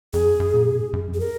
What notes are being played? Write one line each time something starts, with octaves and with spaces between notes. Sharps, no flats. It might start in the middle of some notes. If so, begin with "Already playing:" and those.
F2 G#4
F#2
F#2
A#2
B2
G#2
F#2
F2
G#4
A#4